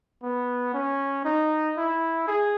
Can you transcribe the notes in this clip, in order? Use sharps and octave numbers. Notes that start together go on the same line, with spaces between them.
B3
C#4
D#4
E4
G#4